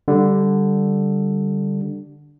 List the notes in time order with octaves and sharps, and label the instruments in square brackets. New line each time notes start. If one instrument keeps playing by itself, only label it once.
[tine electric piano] D3 G3